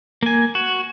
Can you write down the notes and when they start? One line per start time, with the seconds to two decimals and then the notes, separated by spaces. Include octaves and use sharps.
0.23 A#3 G#5
0.55 F#4